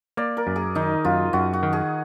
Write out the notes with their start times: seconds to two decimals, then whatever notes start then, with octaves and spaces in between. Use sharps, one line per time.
0.17 A#3 D5
0.37 A#4
0.47 F#2
0.56 G#4
0.75 D#3 D#4
1.05 F#2 F4
1.33 F#2 F#4
1.53 F#4
1.63 D#3
1.73 G#4